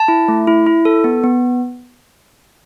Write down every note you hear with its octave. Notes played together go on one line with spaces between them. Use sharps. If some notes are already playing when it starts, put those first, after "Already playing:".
Already playing: A5
E4
A3
E4
E4
A4
B3
B3